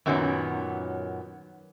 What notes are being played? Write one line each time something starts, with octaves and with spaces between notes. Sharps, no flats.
F#2 A#2 D#3 F#3 B3 C#4